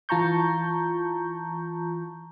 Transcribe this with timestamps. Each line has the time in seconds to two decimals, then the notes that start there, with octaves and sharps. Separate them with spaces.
0.09 E3 F4 A5 A#5 C#6 G6